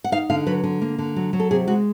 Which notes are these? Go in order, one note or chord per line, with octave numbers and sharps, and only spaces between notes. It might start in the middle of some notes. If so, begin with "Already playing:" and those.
F#5
D#4 F5
D3 F5
F#3 B4
D3
A#3
D3
F#3
F#3
A4
C3 G#4
G#3 F#4